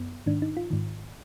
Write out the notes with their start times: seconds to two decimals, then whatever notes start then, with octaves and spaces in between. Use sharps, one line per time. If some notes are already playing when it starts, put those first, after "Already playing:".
Already playing: F#2 B3
0.26 G#2 D#3 D4
0.42 D#4
0.57 F4
0.70 G#2 D#3